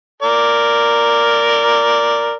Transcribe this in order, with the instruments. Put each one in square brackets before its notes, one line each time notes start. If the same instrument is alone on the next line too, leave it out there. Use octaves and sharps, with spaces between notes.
[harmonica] A#4 D5